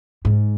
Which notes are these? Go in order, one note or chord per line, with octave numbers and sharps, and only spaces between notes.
G#2